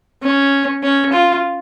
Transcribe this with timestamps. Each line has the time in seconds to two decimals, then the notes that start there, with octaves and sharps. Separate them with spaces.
0.23 C#4
0.83 C#4
1.13 F4